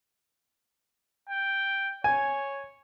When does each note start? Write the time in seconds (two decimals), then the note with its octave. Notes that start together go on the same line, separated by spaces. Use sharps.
1.29 G5
2.04 C#5 G#5